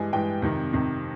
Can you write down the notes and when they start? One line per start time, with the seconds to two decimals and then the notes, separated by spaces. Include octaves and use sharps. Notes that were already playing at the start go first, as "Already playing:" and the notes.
Already playing: G2 E3 G#3 G#5
0.12 G2 E3 G#3 G5
0.42 F2 C3 D#3
0.73 F2 C3 D#3